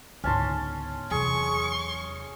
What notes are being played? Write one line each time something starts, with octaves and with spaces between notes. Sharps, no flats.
C#2 G#2 D3 B3 C#4 A5 C6
E2 C3 F#3 G#4 C#6